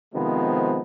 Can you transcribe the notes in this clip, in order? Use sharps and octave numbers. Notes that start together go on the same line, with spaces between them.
C3 D#3 F3 G#3 B3